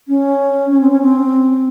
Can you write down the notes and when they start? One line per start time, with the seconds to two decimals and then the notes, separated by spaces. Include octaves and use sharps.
0.08 C#4
0.70 C#4
0.80 C4
0.91 C#4
1.01 C4